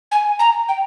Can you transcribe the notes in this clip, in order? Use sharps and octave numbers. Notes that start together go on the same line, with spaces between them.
G#5
A#5
G5